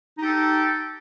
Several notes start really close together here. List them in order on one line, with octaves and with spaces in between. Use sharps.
D#4 G4 A4